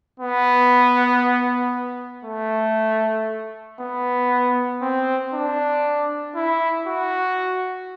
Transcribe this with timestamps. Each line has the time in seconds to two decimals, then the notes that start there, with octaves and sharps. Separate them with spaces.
0.20 B3
2.25 A3
3.80 B3
4.82 C4
5.34 D4
6.36 E4
6.87 F#4